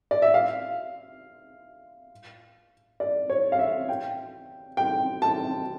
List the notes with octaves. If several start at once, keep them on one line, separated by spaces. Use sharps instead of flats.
D5
E5
F5
D5
C#5
F5
E5
G5
G5
A5